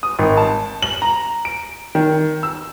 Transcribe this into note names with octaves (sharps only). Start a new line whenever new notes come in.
D#6
G#1
A5
F#7
A#5
D7
D#3
E6